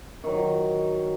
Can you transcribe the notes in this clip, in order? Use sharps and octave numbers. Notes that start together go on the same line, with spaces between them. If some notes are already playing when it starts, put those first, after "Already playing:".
D#3 F#3